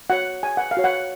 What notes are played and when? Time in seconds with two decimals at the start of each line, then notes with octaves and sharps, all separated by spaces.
0.10 F#4 C#5 F#5
0.43 G#5
0.57 F#5
0.71 F5
0.77 F#4 C#5
0.84 F#5